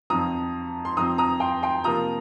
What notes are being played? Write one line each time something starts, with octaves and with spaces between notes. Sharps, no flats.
F2 F3 C4 F4 A#5 D#6
C6
F2 F3 C4 A#5 D#6
A#5 D#6
G5 C6
G5 C6
C3 F3 A#3 F4 A#5 D#6